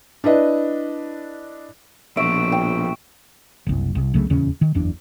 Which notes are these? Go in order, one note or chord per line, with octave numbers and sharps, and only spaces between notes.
D4 E4 B4 D#5
A#1 B2 F3 E5 C#6 D7
G5
F#1 C2
C2
C2 C#3 F#3 A3
D#1 E2 C#3 C#4
D#3
F#1 E2 D4